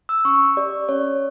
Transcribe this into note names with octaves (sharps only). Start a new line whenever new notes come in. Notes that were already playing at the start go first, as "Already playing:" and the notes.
E6
C#4 C#6
G4 D5
C#4 C#5